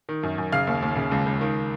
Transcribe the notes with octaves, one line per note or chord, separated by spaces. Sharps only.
D#3
F#2
F#2
C#3 F5 F6
D#2
D#2
C#3
C#2
C#2
D#3